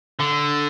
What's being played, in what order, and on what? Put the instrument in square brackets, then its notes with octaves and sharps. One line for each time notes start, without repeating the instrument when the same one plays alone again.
[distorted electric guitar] D3